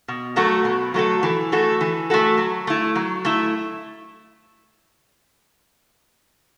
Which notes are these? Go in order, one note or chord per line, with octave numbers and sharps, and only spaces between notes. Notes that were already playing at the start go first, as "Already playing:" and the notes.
B2
F#3 A3 F#4 A4
B2
F#3 A3 F#4 A4
E3
A3 F#4 A4
E3
A3 F#4 A4
F#3
A3 E4
F#3
A3 E4